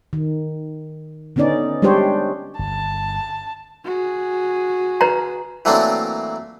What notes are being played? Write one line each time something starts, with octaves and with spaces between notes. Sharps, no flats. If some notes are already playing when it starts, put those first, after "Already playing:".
D#3
D3 B3 C#4 D#4 D5
G3 G#3 D4 G4 C5 C#5
G1 A5
F#4 G#4
B4 A#5
E3 F#3 A3 A#3 C4 D4